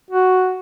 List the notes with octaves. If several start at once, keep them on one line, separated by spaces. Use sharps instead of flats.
F#4